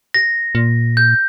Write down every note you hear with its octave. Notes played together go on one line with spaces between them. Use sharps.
A#6
A#2
G6